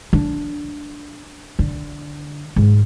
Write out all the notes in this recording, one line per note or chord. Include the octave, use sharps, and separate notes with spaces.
D4
D3
G#2